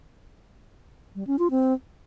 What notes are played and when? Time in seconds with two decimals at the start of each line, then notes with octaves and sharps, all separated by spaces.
1.15 G3
1.27 C#4
1.39 F4
1.50 C4